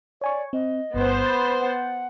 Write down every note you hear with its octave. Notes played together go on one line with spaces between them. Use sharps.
C#5 D5 G#5 C#6
C4 D#5
G1 G2 B3 C5
B5 G6 A6
F#5